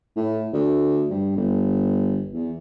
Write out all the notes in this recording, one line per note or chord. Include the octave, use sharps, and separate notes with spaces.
A2
D2
G2
G1
E2